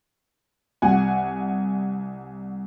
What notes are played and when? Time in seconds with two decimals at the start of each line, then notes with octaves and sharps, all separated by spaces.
0.82 C2 F#5 G#5